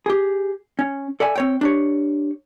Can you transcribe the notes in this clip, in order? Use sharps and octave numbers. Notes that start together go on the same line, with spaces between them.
G4 G#4
C#4
A4 D5 E5 G#5
C4 C#5 G5
D4 G4 C#5